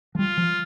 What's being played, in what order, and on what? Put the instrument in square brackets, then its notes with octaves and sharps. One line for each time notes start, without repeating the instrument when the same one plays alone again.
[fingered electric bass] F3
[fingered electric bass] G3 [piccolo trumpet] F4
[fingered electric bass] F3